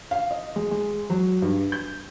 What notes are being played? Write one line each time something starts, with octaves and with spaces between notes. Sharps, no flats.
F5
D#5
G#3
G#3
F#3
G2
G6